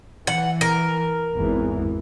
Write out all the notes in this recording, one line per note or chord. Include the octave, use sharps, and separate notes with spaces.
E3 F#5
A#4
G#1 E2 E3